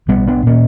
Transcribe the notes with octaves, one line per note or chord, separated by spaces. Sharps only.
B1 G3 B3
B3 D4
A#2 A#3 C#4